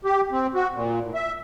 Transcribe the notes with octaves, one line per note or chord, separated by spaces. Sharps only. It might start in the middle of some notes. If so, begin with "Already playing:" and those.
G4
C4
F#4
A#2
A2
E5